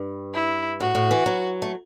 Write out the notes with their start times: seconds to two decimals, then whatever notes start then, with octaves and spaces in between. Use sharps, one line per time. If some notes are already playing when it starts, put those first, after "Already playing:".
Already playing: G2
0.34 E4
0.80 A2 F#4
0.95 A2
1.11 E3
1.26 F#3
1.62 A3